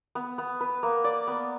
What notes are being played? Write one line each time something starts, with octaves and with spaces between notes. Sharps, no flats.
B3
B3
B4
A#3
D5
B3